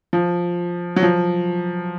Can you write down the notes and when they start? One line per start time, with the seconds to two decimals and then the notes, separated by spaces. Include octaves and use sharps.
0.13 F3
0.96 F#3
1.02 F3